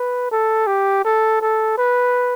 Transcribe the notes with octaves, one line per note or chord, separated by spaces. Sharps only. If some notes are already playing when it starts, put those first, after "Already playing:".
Already playing: B4
A4
G4
A4
A4
B4